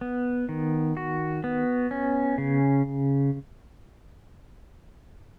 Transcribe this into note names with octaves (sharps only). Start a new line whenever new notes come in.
B3
D#3
F#4
B3
C#4
C#3